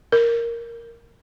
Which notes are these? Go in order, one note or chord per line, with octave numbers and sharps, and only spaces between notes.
A#4